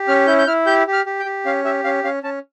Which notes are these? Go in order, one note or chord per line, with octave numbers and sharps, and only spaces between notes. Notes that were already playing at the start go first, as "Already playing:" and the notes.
Already playing: G4
C#4 F6
E4 G6
G6
E4 F6
G4 G6
G4
F6
G4
G5
G4
C#4 F5
G4 E5
C#4 F5
C#4 F5
C#4 A5